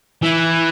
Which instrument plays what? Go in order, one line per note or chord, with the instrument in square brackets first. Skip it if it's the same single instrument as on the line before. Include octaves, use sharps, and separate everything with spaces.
[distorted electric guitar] E3